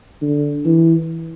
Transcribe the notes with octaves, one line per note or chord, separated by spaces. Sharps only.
D3
E3